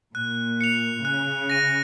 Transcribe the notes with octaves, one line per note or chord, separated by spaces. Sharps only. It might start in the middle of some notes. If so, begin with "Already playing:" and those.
A#2 F#6
C#7 F7
C#3 F#6
A#6 D#7